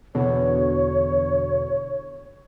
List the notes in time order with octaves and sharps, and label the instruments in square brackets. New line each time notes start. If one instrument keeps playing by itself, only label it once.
[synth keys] E2 B2 D3 [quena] C#5